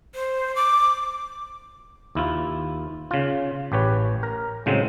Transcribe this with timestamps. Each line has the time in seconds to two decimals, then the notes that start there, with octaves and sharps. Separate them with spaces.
0.15 C5
0.55 D6
2.15 D#2 E4 F4
3.11 C#3 F4
3.72 A1 G4 B4 C#5
4.23 A#4
4.66 A2 C#3 F#3 G#3 C4